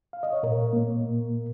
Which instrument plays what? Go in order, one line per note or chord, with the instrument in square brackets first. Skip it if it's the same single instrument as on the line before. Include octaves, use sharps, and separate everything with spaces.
[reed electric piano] F5
D#5
C#5
A#2 A#4
A#3
A#2